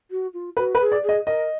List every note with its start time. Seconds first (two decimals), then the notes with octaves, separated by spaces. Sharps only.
0.11 F#4
0.33 F4
0.57 F#4 B4
0.75 B4
0.80 G#4
0.92 D5
1.03 G#4
1.09 D#5
1.26 A#4 D#5